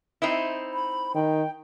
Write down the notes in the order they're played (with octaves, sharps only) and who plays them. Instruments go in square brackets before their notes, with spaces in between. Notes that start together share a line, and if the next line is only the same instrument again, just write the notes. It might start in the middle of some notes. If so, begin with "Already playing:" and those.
[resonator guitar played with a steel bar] C4 D#4 E4
[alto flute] B5
[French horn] D#3 [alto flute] G5